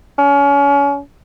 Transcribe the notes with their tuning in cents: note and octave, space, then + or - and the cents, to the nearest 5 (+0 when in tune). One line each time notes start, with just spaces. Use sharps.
C#4 +30